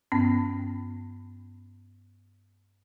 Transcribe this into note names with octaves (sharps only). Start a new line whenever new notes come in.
G2 B3 C#4